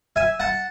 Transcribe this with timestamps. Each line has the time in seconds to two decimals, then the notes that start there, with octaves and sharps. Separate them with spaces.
0.16 E5 G#5
0.40 F#5 A5